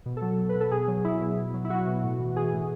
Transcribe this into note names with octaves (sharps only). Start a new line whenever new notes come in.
B2
A4
F#3
F#3
B4
B2
A4
B2 G#4
F#3
F#3 E4
B2
B2
F#3
E4
F#3 F#4
B2
A2
E3
E3 G#4
A2